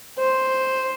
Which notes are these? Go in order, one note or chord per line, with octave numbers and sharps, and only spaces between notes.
C5